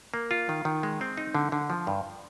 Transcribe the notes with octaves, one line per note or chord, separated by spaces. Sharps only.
A#3
F4
D#3
D#3
G#3
C4
D#4
D3
D3
F3
G2